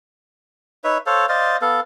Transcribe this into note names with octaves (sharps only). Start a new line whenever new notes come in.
D#4 B4 C#5 E5
A4 C5 C#5 F5
C5 D5 D#5 F5
B3 A4 F5